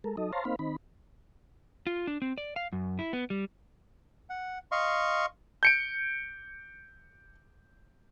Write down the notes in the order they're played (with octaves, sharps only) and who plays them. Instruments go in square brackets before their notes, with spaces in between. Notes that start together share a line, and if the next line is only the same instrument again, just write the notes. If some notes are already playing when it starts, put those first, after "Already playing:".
[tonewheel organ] G#3 A4 A#4
F#3 D#4 A4 D#5
C5 C#5 F5 A5 A#5 C6
A#3 C4 D#4 C5 F5 B5
D#3 C4 D#4 B5
[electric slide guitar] F4
D4
C4
D5
F5
F#2
E4
B3
G3
[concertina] F#5
D#5 F5 C6 C#6
[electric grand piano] G6 C#7 D7